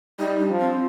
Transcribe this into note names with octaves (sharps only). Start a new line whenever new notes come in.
G3 D#4
D4
F3
C4